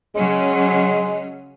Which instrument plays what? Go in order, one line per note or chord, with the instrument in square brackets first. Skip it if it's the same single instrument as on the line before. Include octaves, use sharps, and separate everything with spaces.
[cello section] C#3 F#3 C#4 [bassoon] G#3